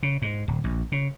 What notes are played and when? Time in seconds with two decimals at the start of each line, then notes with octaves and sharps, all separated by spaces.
0.03 C#3
0.22 G#2
0.48 D1
0.64 A#1
0.92 C#3